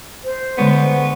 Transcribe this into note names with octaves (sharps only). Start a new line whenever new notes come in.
C5
D3 G#3 B3 C#5